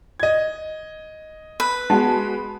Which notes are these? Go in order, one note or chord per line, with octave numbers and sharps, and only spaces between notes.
D#5 G#6
B4
G#3 B3 F#4 A5